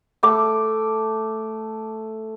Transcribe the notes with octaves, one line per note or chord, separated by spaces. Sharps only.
A3 D6